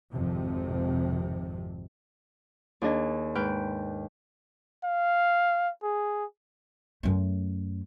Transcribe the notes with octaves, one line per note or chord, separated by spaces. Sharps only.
G#1 F2 C3
D#2 D4 G#4 D#5
G#2 B4 G5 F6
F5
G#4
F#2 A3